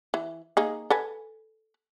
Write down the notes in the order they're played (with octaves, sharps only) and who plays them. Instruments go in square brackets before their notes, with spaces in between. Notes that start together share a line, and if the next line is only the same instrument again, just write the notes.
[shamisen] E3
A#3 D#4 G#4
A4 B4 G#5